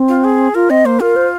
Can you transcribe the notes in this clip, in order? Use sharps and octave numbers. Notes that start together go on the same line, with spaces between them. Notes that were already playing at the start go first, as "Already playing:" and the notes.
Already playing: C4
F4
G#4
F4 A#4
C4 D#5
A#3 C5
F4 A#4
C5